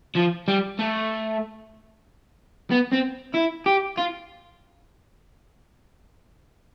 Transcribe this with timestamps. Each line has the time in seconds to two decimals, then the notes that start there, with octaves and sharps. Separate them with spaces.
0.16 F3
0.48 G3
0.79 A3
2.71 B3
2.92 C4
3.34 E4
3.66 G4
3.97 F4